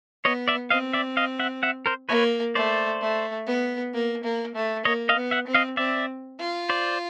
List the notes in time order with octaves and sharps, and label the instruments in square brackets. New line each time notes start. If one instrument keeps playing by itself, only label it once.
[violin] B3 [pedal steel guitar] C#5 D#5
[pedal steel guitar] D5 E5
[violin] C4 [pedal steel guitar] D#5 F5
[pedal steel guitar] D5 E5
D#5 F5
E5 F#5
E5 F#5
A#4 C5
[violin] A#3 [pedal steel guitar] B4 C#5
[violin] A3 [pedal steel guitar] C5 D5
[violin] A3
B3
A#3
A#3
A3
[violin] A#3 [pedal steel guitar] C#5 D#5
[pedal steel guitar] D#5 F5
[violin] B3
[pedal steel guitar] E5 F#5
[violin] C4
[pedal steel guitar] D#5 F5
[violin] C4 [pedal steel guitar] D5 E5
[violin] F4
[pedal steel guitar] C5 D5